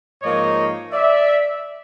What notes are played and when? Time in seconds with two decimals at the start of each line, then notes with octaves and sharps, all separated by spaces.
0.22 G#2 F3 A#3 D#4 C#5 D#5
0.92 D5 E5